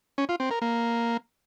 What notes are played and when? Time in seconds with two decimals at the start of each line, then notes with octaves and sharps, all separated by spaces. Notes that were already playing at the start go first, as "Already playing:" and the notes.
0.18 C#4
0.29 F4
0.40 C4
0.51 A#4
0.62 A#3